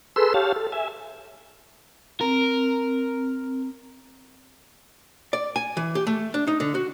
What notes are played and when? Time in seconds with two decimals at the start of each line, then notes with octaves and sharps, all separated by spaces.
0.16 G#4 A4 B4 C6 E6
0.34 G4 C#5 F5 A5
0.56 A4
0.72 E5 G#5
2.21 C4 A#4
5.33 D5
5.56 G#5
5.77 E3
5.95 G4
6.07 A3
6.34 D4
6.47 D#4
6.60 D3
6.75 F#4